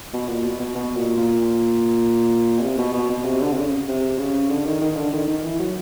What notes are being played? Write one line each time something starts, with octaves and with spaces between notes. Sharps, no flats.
B2
A#2
B2
B2
B2
A#2
A#2
B2
C3
B2
B2
B2
C3
D3
C3
C#3
C3
C#3
D3
D#3
D#3
D3
D#3
D#3
E3
F#3